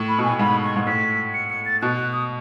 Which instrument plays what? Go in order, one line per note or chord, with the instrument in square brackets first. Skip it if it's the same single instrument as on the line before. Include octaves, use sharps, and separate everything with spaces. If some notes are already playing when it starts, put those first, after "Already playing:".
Already playing: [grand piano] A2
[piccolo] B5
[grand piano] B2
[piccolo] G#5
[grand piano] A2
[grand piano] G#2 [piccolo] B5
[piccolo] C#6
[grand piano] G#2
[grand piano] A2 [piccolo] B6
[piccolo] C#7
C#7
A6
[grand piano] B2 [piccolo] F#6
[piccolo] F#6
D#6